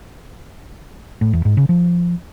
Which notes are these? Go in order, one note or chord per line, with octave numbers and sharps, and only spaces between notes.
A2
E2
G#2
C#3
F3